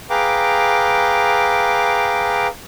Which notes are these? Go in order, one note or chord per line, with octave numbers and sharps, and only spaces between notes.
G#4 B4 F5 G5 A#5 D6